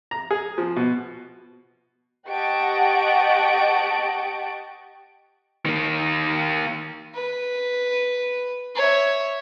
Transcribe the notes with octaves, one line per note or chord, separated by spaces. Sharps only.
A#5
G#4
F3
B2
G4 D#5 F#5 A5 C#6 D7
D#3 A#3
B4
C#5 E5